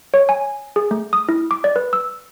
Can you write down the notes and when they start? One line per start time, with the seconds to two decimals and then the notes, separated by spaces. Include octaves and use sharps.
0.14 C#5
0.29 G#5
0.76 G#4
0.91 A3
1.13 D#6
1.29 E4
1.51 D6
1.64 D5
1.76 B4
1.93 E6